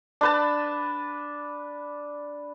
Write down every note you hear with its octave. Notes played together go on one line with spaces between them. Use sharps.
D4 B4 A5